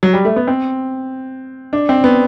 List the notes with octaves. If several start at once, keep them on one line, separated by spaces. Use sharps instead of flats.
F#3
G3
A3
B3
C4
D4
C4
B3